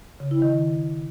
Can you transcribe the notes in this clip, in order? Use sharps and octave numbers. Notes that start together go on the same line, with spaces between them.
C#3
E4
D#3